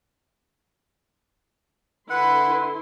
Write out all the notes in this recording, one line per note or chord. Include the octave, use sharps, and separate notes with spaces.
D3 E4 B4 F#5 C6